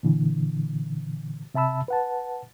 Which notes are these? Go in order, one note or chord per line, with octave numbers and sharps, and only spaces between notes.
A#2 D3 E3
C3 E5 A5 B5 E6
B4 F#5 A5